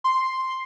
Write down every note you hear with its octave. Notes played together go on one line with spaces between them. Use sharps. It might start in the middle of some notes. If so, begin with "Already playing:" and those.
C6